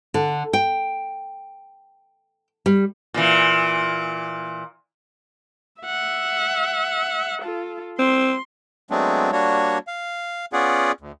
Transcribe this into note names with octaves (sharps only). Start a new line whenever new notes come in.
D3
G5
G3
A#2 E3
E5 F#5
F4 A4
C4 C6
F#3 G#3 A3 B3 C4 D4
G3 A#3 D4 F#4 C#5
F5
B3 C#4 F4 G#4 D5 F#5
D2